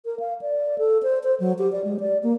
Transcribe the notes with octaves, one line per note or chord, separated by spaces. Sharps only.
A#4
F5
D5
A4
C5
C5
F#3
G4
D5
G#3
D5
A#3